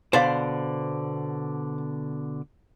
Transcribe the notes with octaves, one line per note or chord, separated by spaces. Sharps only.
B2 D3 C5 D5 F5 F#5